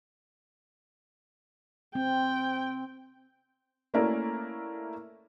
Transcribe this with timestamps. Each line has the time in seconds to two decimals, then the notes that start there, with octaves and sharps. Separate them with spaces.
1.95 C4 G5
3.94 A3 A#3 C#4 E4 A#4 D5